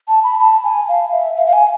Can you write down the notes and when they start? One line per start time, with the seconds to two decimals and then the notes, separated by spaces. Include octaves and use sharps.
0.08 A5
0.24 B5
0.40 A5
0.64 G#5
0.89 F5
1.12 E5
1.37 F5
1.47 F5
1.53 G#5